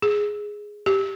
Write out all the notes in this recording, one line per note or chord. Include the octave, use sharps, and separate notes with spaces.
G#4
G4